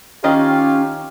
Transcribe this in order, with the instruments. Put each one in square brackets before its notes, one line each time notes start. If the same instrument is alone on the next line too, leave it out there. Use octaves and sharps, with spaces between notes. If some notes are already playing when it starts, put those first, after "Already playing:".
[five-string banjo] D#3 D#5 [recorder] C#4 [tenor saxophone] F4 [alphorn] G4